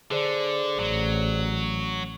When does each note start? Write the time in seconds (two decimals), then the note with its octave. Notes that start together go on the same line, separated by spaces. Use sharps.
0.11 D3 G#4 C5 D5
0.79 A1 F#3